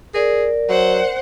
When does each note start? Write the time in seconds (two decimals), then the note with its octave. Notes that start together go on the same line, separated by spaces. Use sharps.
0.14 G#4 A#4 D5
0.69 F#3 C5 F#5